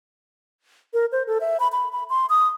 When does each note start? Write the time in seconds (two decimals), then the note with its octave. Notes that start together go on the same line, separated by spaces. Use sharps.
0.94 A#4
1.12 C5
1.27 A4
1.41 E5
1.60 B5
1.72 B5
1.92 B5
2.10 C6
2.29 D#6